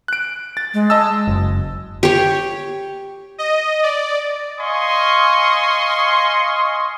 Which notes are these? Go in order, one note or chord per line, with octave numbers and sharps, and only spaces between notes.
F#6 D7
A6
G#3
D#5 A5 E6
F#1
G4 C#5
D#5
D5
D#5 F5 G#5 C6 C#6 D#6